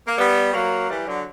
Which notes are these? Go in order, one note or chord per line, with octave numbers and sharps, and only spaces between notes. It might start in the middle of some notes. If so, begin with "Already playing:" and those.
A#3
G3 B3
F#3 A#3
E3 G3
D3 F#3